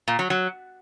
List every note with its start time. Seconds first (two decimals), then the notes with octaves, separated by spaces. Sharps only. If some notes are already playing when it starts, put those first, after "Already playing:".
0.08 A#2
0.19 F#3
0.30 F#3